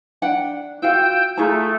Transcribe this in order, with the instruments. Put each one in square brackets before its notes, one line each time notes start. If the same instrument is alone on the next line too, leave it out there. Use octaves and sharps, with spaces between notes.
[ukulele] D4 F#5 G5
[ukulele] F4 F#4 F5 [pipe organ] G5 E6 G6
[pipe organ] A3 [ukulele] F4 G#4 A#5